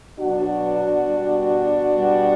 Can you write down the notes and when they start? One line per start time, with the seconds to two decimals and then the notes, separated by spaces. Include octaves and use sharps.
0.19 B2 F#3 D4 F#4
1.05 B2 G3
1.91 B2 G3